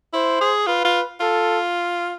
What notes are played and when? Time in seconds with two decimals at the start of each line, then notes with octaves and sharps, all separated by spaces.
0.13 E4 C5
0.41 G#4
0.67 F4 B4
0.85 F4
1.20 F4 A4